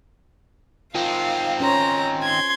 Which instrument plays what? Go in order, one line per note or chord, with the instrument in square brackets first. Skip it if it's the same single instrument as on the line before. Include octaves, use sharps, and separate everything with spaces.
[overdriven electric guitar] D#3 C4 [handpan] F4 [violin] F5
[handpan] C#4 C5 C#5 [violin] A#5
[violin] C6 G#6